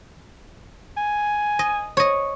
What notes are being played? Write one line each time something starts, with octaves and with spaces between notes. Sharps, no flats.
G#5
D#5
C#5 D#5